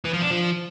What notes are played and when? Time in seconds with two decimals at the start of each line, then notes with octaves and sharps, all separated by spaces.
0.05 E3
0.13 F3
0.22 D4
0.30 F3